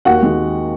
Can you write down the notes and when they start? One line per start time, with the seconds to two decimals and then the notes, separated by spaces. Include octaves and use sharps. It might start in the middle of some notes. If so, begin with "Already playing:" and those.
0.05 D#2 F#4 F#5
0.22 D#3 G#3